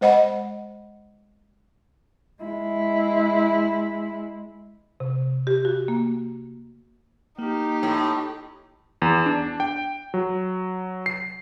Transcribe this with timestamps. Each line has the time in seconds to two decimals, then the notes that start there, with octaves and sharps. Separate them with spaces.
0.01 G#3 C5 D#5 F#5 B5
2.43 G#3 E4
5.00 C3
5.47 G4
5.65 F#4
5.88 A#3
7.39 A#3 D#4 G4
7.83 A2
9.02 E2
9.26 D4
9.60 G5
10.14 F#3
11.06 C7